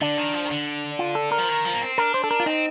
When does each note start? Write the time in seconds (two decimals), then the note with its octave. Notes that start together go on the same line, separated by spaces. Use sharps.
0.01 D3 D4
0.17 D#3
0.34 F3
0.45 D#3
0.50 D3
0.99 F4
1.15 A4
1.32 A#4
1.38 F3
1.49 D#3
1.65 F3
1.74 A#3
1.81 C4
1.98 D4 A#4
2.14 C5
2.24 A4
2.31 A#4
2.40 F4
2.46 C4 D#4